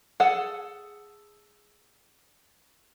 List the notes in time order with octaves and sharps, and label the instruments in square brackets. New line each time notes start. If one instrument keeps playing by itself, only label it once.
[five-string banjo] G#4 A4 F#5